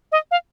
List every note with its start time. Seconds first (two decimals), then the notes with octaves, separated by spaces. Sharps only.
0.12 D#5
0.31 F5